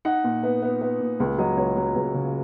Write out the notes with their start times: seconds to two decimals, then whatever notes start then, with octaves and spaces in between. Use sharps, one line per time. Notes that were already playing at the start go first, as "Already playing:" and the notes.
0.05 D#4 F#5
0.24 A#2
0.43 B3
0.62 B3
0.81 B3
1.00 A#2
1.20 C#2
1.38 F#3 D#5
1.57 C#2 C#5
1.76 F#3
1.96 C#2
2.14 C#3